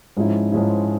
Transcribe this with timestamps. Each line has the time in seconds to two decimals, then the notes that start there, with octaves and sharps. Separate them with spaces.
0.17 G#2 F3 G#3 C#4 E4
0.52 G#2 F3 G#3 C#4 E4